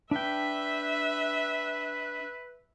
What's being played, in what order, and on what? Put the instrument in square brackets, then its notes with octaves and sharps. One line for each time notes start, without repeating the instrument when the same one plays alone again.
[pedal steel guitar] D4 G5 [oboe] B4 [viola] E5